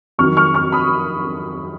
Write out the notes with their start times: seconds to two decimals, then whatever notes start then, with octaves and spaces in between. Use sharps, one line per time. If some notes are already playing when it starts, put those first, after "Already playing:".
0.19 F2 D#3 F#3 C#6 F6
0.37 C#6 F6
0.54 C#6 F6
0.72 B5 D#6